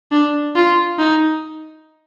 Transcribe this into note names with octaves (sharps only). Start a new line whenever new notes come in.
D4
F4
D#4